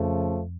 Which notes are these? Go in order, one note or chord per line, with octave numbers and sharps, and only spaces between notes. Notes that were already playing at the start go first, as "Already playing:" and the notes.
Already playing: F2 C#3 F3 A3